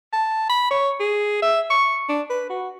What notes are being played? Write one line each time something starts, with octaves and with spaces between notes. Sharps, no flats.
A5
B5
C#5
G#4
E5
C#6
D4
B4
F#4